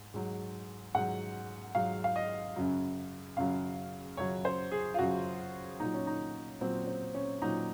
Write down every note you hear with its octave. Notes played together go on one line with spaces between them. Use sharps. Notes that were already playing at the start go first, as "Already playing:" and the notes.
Already playing: G#2
G#2 F#3
G#2 F#3 F#5
G#2 F#3 F5
F5
D#5
F#2 C#3 F#3
F#2 C#3 F#3 F5
F#2 C#3 F#3 C#5
C5
G#4
F4
F#2 C#3 F#3 F#4
A#2 F#3 D#4
C#4
D#4
A#2 F#3 C4
C4
C#4
A#2 F#3 D#4